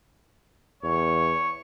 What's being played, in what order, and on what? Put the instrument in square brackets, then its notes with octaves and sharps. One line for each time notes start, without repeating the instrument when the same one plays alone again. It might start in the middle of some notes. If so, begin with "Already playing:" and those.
[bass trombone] E2 [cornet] C#5